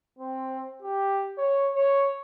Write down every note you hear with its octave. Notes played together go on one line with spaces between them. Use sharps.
C4
G4
C#5
C#5